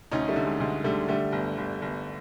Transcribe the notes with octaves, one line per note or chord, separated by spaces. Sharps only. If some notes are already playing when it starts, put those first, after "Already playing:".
D2 C#4 D#4
G3 A3
D3
G#3
D2 G#3
D3 G3 A3
D3 G3 A3
G1
G1
G1